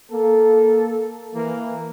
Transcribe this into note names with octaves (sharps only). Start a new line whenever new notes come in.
A#3 A4
E3 A#3